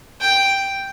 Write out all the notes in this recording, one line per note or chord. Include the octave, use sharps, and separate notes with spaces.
G5